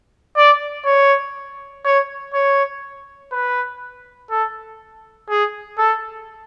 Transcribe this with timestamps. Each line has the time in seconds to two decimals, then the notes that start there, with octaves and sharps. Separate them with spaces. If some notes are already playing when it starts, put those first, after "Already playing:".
0.36 D5
0.86 C#5
1.85 C#5
2.34 C#5
3.32 B4
4.30 A4
5.29 G#4
5.78 A4